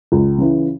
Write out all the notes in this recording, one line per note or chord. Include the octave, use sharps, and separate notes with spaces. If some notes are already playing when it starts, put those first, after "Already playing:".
C#2
C#3 E3